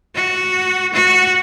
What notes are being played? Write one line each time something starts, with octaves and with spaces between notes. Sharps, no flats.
F#4
F#4